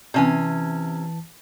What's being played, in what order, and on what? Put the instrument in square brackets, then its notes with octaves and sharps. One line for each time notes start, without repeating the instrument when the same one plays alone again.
[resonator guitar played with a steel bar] C3 C#4 G#5 [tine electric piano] E3 A5